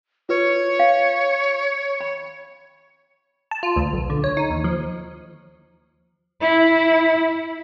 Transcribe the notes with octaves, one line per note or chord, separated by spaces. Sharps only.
F4 B4 C#5
F5
B5
A5
F4
D2
B1
D3
C#5
D#4
D#2
F3
E4